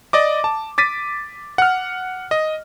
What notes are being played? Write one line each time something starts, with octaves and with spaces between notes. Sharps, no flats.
D5 D#5 D6
A5
D6 A6 B6 D#7
F#5 F6
D#5